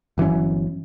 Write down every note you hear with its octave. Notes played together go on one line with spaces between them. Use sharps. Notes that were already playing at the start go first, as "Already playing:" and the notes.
G1 E3 F#3 C#4